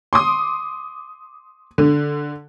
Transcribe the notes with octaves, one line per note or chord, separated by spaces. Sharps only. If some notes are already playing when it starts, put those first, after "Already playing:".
C6 D6 D#6
D3